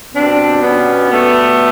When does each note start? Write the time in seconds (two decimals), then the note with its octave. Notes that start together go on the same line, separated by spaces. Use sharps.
0.15 B2 G3 C4 D4
0.63 B3 C#4
1.11 A3 B3